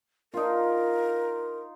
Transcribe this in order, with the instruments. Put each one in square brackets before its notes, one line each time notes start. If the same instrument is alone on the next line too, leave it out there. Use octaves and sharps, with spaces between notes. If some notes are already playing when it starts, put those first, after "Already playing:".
[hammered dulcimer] D#4 F4 [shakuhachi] A#4